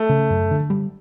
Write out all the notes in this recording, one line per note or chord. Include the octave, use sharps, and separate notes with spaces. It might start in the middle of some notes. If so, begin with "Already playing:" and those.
Already playing: A3
C#3
F#2
D3
G3